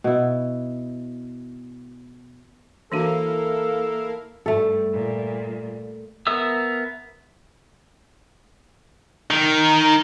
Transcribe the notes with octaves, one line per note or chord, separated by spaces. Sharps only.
B2 E4
E3 A#3 D4 E4 F#4 A4 A#4 F5
G2 G3 A3 A4
A#2 G3
B3 A#4 E5 D#6 E6
D#3